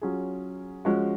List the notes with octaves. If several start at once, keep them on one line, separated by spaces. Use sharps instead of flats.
F#3 C#4 F4 G#4
F3 G#3 C#4 F#4